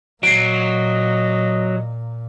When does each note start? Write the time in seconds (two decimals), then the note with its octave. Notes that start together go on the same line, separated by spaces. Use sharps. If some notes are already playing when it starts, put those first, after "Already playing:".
0.23 A#2 F#3 D#5 C7 D7